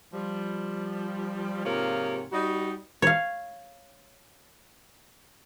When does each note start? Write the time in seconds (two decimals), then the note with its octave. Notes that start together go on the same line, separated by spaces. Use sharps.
0.13 F3 G3
1.65 G#2 C3 F3 A#3 F4 C#5
2.32 G3 D#4 F#4
3.02 C#5 F5